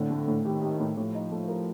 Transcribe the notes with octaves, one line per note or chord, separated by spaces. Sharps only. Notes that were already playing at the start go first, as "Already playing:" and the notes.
Already playing: A2 D3 C4
A3
A2
D#3 G4
G4
A2
A2 F3
D#4
A3
A#4